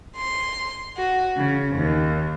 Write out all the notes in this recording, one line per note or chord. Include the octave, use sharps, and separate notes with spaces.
C6
F#4
C#3
D#2